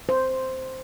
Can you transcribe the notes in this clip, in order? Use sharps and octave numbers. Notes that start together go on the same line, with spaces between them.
C5